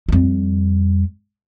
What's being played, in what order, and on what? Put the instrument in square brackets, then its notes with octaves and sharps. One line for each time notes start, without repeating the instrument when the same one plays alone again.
[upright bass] F2 G3